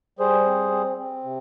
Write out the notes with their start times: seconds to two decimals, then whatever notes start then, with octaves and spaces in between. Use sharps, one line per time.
0.19 G3 G#4 C5
0.46 C4
0.71 C4
0.98 C4
1.24 C3